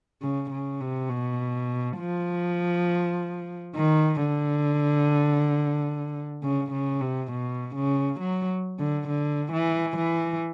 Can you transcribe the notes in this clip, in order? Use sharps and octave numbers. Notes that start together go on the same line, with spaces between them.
C#3
C#3
C3
B2
F3
D#3
D3
C#3
C#3
C3
B2
C#3
F#3
D3
D3
E3
E3